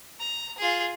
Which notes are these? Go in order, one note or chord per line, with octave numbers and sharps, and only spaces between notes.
A#5
F4 G#4